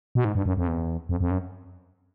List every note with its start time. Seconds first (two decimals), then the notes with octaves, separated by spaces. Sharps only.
0.15 B2
0.25 G#2
0.35 G2
0.46 F#2
0.57 F2
0.68 E2
1.09 F2
1.20 F2
1.31 F#2